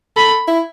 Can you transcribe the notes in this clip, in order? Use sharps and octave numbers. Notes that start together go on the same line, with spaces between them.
A4 B5
E4